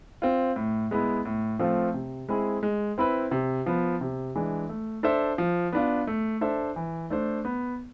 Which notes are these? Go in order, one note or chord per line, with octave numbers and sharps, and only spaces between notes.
C4 F4
A2
G#3 B3 E4
A2
F3 A3 C4 F4
C3
G#3 C4 E4 G#4
G#3
C4 E4 B4
C3
F3 B3
C3
E3 G#3 D4
A3
D4 A4 C5 E5
F3
B3 D4 F4
A3
D4 A4 C5 E5
E3
A3 D4 A4 C5
B3